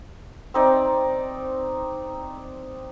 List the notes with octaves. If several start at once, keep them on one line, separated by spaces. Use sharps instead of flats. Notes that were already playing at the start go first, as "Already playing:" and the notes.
C4 D#4 D5